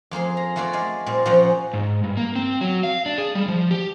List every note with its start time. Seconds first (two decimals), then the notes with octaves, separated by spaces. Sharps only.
0.11 F2 A#3 G#4 C6
0.37 A#5
0.56 A3 A#3 F4 F#4 C#5 D5
0.73 G#3 F4 D5
1.06 A#2 G3 C4
1.25 A#2 F3 A#3 C#4 F#5 G5
1.74 G#2
2.04 G2
2.17 A#3
2.36 C4
2.61 F#3
2.83 F5
3.06 D4
3.18 G#4
3.35 G3
3.48 F3
3.71 G4